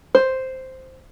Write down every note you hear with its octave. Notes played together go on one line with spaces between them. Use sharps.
C5